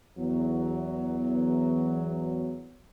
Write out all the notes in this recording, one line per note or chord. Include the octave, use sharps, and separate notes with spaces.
E2 F#3